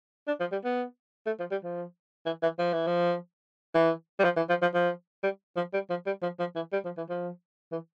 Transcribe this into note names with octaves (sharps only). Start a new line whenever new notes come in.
D4
F3
G3
B3
A3
F3
G3
F3
E3
E3
F3
E3
F3
E3
G3
F3
E3
F3
F3
F3
G3
F3
G3
F3
G3
F3
F3
E3
G3
F3
E3
F3
E3